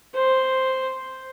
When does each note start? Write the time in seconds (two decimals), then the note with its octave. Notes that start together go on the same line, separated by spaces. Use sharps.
0.14 C5